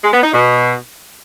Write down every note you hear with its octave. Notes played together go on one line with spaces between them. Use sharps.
G#3
B3
D#4
B2